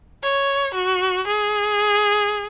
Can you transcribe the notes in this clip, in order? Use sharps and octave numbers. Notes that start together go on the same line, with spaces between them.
C#5
F#4
G#4